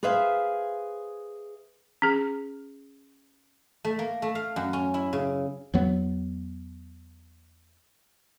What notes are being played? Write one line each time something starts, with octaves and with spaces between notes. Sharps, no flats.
G#4 B4 C5 E5 F5
C#4 G#4
A3
A#3
A3
F5
F#2
C#4
E4
C#3
E2 F#3 B3